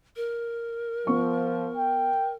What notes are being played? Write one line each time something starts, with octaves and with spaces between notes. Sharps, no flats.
A#4
F3 B3 C#6
G5